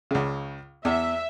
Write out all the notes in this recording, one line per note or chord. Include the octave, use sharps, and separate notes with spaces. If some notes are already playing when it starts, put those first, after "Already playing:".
C#2 C#3
E2 E5